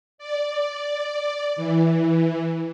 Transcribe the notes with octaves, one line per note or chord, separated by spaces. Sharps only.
D5
E3